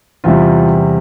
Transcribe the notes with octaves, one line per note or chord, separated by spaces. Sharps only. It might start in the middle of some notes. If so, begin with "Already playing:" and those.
E2 C3 G3 F4